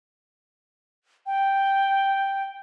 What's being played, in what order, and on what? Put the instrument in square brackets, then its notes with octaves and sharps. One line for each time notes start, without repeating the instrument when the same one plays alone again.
[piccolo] G5